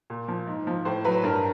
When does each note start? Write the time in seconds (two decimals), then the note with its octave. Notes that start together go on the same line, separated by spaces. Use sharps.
0.10 A#2
0.28 F3
0.47 G#2
0.67 F3
0.85 A2 C5
1.05 F#3 B4
1.23 G2 A#4